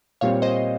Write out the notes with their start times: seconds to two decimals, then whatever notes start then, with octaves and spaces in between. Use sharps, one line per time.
0.21 A#2 G3 C4 C#5 F5
0.42 C5 D#5